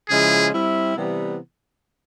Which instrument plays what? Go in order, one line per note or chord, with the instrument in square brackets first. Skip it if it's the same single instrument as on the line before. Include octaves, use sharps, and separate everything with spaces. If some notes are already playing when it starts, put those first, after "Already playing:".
[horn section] C#3 F3 G#3 C#4 E4 [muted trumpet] G#4
[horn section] G3 C4 E4
C3 E3 G3 B3